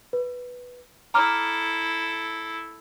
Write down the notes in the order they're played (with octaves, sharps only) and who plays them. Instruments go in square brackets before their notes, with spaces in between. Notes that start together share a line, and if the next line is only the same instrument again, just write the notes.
[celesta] B4
[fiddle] E4 A4 [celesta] A#5 D6 F6